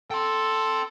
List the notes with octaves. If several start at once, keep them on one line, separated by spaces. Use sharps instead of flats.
A4 G5 C6